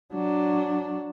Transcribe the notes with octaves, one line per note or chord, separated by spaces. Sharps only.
F#3 D4